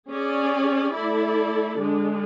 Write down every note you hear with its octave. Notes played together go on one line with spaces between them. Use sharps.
C#4 G#4 D5
A3 E4 A4 D5
D3 G#3 D4